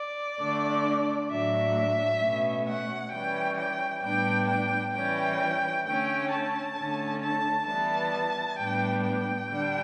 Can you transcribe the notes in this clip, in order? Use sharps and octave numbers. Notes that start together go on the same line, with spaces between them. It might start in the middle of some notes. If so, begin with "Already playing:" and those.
Already playing: D5
D3 A3 D4
A2 F#3 A3 D4 E5
B2 A3 C#4
F#5
E3 G3 C#4 G5
G5
A2 G3 B3 D4 G5
G5
E3 G3 C#4 G5
D3 A3 C#4 G5
A5
D3 A3 C#4
A5
E3 G3 B3 A5
A2 G3 B3 D4 G5
G5
D3 G3 D4